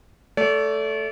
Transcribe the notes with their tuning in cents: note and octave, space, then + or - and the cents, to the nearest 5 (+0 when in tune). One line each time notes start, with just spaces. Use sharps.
A3 +0 D5 -35